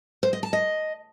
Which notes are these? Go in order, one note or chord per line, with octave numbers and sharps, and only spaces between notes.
C5
D#5
A5
D#5